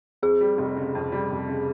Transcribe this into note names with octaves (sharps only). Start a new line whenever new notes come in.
F2 G#4
G3
F1
C#3
F2
G3
F1
C#3